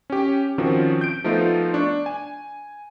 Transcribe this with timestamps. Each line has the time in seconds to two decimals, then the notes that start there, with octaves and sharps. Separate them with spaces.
0.10 C#4 G4
0.58 D#3 F3 C4 C#4 F#4
1.01 G6 D7
1.24 F3 A3 B3 D#4 F4
1.74 D4 C#6
2.06 G#5